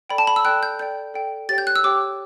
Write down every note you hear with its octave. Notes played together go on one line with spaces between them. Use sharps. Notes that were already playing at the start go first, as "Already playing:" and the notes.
A4 D5 G5 B5
A5
B5
E6
A4 D5 G5 F#6
G6
A4 D5 G5 G6
A4 D5 G5
G4 C#5 G5 A6
G6
F#6
E6
G4 C#5 G5 D6